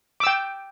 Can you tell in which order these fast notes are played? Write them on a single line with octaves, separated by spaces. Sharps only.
D6 E6 G5